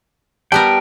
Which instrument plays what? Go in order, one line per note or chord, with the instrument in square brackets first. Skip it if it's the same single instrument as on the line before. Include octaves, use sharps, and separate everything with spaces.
[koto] G3 B3 A#4 [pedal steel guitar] G5 [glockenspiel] A5